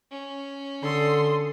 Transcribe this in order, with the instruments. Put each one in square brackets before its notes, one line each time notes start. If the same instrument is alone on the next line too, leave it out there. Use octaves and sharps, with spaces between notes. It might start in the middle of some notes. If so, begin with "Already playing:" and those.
[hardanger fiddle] C#4
[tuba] D3 [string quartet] A4 C6 D#6